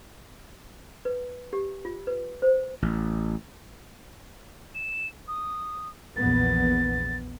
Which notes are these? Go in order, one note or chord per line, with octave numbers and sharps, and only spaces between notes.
B4
G4
F4
B4
C5
A1
E7
D#6
A#1 E2 B3 A6